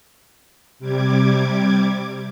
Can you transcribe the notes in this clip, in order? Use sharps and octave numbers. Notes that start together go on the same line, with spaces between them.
C3 G3 D6 G#6